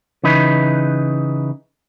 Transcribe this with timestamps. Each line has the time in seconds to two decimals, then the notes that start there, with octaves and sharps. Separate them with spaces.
0.24 C#3 E3 D#4 B4